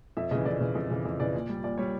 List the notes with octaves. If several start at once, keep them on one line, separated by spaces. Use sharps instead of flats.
F2 E5
C#3 E3 D#5
F2 D5
C#3 E3
F2
C#3 E3
F2
C#3 E3 D5
A#2
G3
A#2 D5
G3 C#5